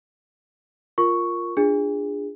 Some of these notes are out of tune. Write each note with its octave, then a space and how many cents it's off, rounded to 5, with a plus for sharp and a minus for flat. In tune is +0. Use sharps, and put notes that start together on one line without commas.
F4 +0 A#4 +0 C#6 +0
D4 +0 F4 -15 G#4 -20